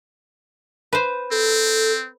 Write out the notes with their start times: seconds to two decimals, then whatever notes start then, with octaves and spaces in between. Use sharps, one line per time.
0.93 B4 C5
1.31 C4 A4